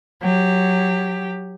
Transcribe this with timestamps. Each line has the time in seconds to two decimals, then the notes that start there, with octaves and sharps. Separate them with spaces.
0.21 F#3 G4